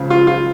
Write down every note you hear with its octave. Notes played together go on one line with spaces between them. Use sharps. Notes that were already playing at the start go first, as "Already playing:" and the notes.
Already playing: C#2 C#3 F3
F4
F4